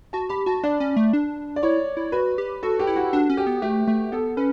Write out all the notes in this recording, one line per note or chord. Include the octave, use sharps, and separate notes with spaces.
F#4 A5
G4 B5
F#4 A5
D4 D5
C#4
A3
D4
D5
E4 C#5
E4
F#4 B4
G4
F#4 A4
G4
E4
F#4
D4 F#4
C#4
G4
B3
A3 G4
A3
B3 A4
C#4 B4